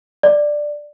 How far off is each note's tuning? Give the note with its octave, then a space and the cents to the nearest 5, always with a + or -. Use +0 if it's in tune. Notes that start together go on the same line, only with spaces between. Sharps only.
D5 +5